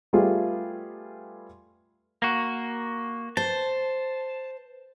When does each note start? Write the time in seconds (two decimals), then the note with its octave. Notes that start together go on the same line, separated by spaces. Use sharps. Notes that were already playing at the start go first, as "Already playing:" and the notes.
0.13 G3 A3 B3 F4 G#4
2.22 A#3 F#4
3.37 C5 A5